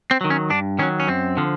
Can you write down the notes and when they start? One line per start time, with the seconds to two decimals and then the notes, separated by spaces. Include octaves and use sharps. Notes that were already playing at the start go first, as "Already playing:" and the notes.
0.11 C4
0.21 D#3 F#3
0.30 C#4
0.50 G2 D4
0.79 D#3 F#3 C#4
1.00 C#4
1.07 F#2 C4
1.37 D3 F3